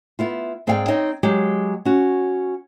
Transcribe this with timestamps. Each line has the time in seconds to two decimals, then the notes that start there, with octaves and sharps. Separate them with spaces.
0.19 B3 E4 F4
0.67 G#2 C4 G#4 D5 F5 G5
0.88 C4 D#4 C#5 D#5 G5
1.23 F#3 G#3 G4
1.85 C#4 F#4